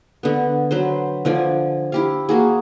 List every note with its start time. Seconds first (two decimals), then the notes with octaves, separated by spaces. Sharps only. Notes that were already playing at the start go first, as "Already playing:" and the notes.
0.23 D3 B3
0.71 F#3 B4 C5
1.25 D3 F3 D5 G#5
1.92 E4 G4 F5
2.29 A#3 F#4 G#4